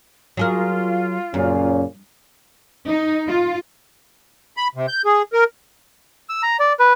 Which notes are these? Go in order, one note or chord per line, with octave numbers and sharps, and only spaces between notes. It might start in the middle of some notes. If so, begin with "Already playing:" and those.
F#3 F4 G#4 A#4
F#2 A#2 C#3 C#4
D#4
F4
B5
C3
G6
G#4
A#4
E6
A#5
D5
B4